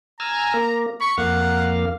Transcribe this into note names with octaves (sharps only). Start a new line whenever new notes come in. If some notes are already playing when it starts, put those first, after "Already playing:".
G#5 A#5 E6 F6
A#3
B5 C#6
F2 A#3 F5 F#5